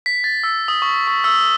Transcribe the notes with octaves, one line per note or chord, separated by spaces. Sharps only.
B6
A6
E6
D#6
C#6
C#6
E6